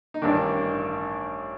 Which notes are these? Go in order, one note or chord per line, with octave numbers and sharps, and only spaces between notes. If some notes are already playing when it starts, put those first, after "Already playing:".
D#4
A1 G2 D#3 D4